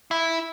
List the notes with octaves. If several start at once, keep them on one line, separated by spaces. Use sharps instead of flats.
E4